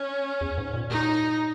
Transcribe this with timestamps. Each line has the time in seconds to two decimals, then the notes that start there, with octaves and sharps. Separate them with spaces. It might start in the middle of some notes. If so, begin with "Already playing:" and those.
Already playing: C#4
0.41 E2
0.58 G#2
0.74 A#2
0.90 A#2 D#4